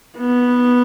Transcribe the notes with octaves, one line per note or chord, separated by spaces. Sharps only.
B3